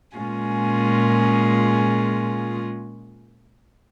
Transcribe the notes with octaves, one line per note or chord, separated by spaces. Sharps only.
A#2 G#3 C#4 F4 G#4